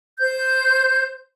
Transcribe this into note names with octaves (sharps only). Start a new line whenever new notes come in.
C5 G6